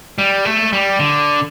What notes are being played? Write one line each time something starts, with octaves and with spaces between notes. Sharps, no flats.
G3
A3
G3
D3